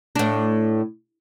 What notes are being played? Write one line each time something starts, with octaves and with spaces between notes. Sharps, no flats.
A2 D4